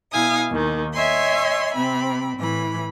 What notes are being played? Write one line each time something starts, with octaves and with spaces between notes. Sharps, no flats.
B2 E4 F5 G#5 D#6
D#2 D#3
C#5 D#5 E5 G#5 C6
C3 C4 B5
A2 E3 B5